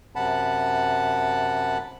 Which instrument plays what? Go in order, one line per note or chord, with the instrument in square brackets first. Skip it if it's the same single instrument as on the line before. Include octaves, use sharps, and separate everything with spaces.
[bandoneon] F#2 C3 F#5 A5 B5